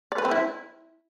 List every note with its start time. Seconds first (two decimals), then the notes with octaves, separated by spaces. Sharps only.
0.12 D5
0.18 B4
0.25 C4
0.31 E4